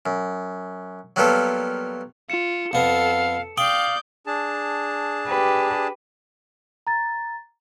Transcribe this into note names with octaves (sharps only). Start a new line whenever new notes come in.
F#2
F#3 G3 A#3 B3 F4 A4
F4 C#7 E7
F2 B3 A4 F5
D5 F5 G5 D#6 G6 F#7
D4 G#4 A5
G4 B4
A#5 A6